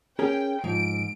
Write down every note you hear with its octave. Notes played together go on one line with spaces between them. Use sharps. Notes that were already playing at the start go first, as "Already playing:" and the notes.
C#4 G#4 A#4 G5
G#2 F3 D7